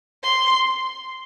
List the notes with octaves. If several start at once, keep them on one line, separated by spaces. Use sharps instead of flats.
C6